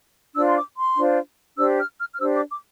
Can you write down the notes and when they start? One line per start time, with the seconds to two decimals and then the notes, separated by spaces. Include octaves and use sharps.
0.35 D4 F4 C5 E6
0.46 C6
0.56 D6
0.76 C6
0.96 D4 F4 C5
1.57 D4 G4 C5 E6
1.78 F6
1.99 F6
2.13 F6
2.19 D4 G4 C5 E6
2.35 D6
2.50 D6